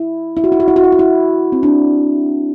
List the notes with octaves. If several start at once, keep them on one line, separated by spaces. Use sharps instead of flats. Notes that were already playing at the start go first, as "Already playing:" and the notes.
Already playing: E4
E4
F#4
E4
F#4
E4
F#4
E4
F#4
E4
C4
D4